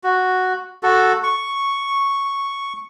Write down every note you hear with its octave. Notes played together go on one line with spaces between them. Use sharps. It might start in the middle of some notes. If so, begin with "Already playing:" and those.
F#4
F#4 A4
C#6